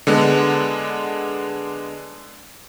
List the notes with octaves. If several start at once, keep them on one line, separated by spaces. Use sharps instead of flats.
D3 G#3 B3